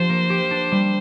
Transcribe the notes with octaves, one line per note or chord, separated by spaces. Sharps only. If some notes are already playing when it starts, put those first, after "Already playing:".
Already playing: F3 D4 G4 C5
A#3
G4
D4
G3